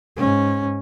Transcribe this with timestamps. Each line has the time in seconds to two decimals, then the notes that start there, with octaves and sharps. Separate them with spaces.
0.17 G#2 C#4